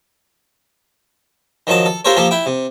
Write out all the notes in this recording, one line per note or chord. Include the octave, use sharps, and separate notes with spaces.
D#3 F3 F#3 A5
A4
F4 G4 A4 A#4 C5 C#5
F3 A#3 G4 A4
E4 G5
C3